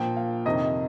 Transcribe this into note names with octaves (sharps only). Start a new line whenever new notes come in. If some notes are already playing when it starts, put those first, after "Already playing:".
Already playing: A#2 F3 G5
F5
F2 C3 D#3 D#5